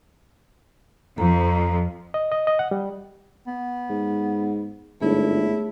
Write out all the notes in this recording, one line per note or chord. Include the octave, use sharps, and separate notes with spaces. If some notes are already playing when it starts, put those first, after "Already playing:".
F2 F3 A4 A#5
D#5
D#5
D#5
F#5
G3
B3
G#2
G1 G#2 A3 E4 G#4 C#5